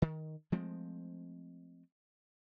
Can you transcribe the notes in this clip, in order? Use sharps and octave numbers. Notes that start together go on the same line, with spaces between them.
D#3
F3 G#3 A3 C4